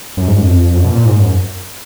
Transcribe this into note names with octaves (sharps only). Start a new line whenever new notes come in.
F#2
G#2
F#2
F2
F#2
B2
A#2
G#2
F#2